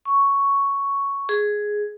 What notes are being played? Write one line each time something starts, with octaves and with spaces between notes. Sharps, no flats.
C#6
G#4